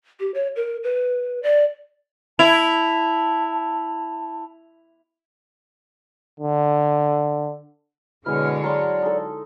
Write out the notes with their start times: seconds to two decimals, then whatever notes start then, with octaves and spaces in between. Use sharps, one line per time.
0.20 G4
0.34 C#5
0.56 A#4
0.84 B4
1.43 D5
2.39 E4 A5 F7
6.40 D3
8.26 B2 D3 G#3 E4 G#4 C#5 F6
8.63 F#3 A#4 D5 A5 C6
9.02 D#4 A4